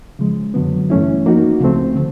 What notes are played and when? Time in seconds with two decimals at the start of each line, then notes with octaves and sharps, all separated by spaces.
0.19 C#3 F3 G#3
0.54 F#2 D3 F#3 B3
0.90 G2 E3 A3 C#4 E4
1.26 F3 A#3 D#4 F#4
1.60 C#2 C#3 F3 A3 C4
1.95 D3